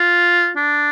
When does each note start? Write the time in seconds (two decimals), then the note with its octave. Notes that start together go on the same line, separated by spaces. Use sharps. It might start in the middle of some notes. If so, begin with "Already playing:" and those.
Already playing: F4
0.57 D4